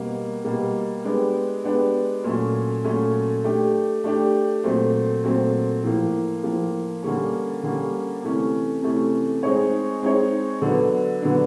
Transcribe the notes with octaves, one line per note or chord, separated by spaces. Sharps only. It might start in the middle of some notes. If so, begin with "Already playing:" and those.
Already playing: B2 G3 A#3
B2 G3 A#3
G#3 B3 D4 G4
G#3 B3 D4 G4
A#2 F#3 A3 C#4
A#2 F#3 A3 C#4
A3 D4 G4
A3 D4 G4
A#2 F#3 A3 C4
A#2 F#3 A3 C4
A2 F3 A#3
A2 F3 A#3
D3 G3 A#3 C#4
D3 G3 A#3 C#4
C3 E3 A3 C#4
C3 E3 A3 C#4
G#3 C4 D#4 G#4 C#5
G#3 C4 D#4 G#4 C#5
D3 F#3 B3 D4
D3 F#3 B3 D4